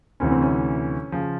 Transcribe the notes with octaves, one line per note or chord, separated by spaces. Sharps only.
D2 C3 E3 C#4
C4
C#4
C#3 F3